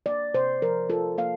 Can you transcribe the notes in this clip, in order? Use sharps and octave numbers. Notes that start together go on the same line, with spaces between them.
A#3 D5
C3 C5
F3 A#4
F4 A4
A#3 F5